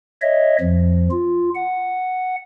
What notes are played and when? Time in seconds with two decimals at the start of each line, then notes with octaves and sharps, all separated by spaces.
0.22 C#5 D#5 E5
0.61 F2 F3
1.11 F4
1.55 F#5